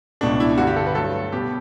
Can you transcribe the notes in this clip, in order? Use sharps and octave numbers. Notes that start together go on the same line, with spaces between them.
C#2 B2 A3 D4
E4
G2 D3 G3 F#4
G4
A4
B4
G2 F#3 A3 A4
B2 G3 B3 G4